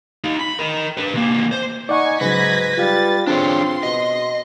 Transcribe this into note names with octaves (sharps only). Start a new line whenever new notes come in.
D#4 F5
B5
A#4 D#5
D4 B4
C3 A#3
C5
D#4 D5 F#5 G#5 C#6
G#2 C#3 F#3 B4 G#6 A#6 B6
G3 F4 F5 A6
C4 D4 G#4 C#5 C6
B2 D#5